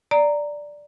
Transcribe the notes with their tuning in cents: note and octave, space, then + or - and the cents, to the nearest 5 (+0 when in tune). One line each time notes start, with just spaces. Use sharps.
D5 +0 A#5 -10